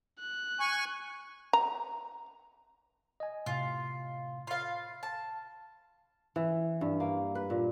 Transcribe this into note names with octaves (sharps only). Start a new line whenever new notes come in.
F#6
G#5 C#6
A#5
D#5 G#5
A2 C3 F4
F4 F5 B5
A5
E3
G2
A#3
B4
A#2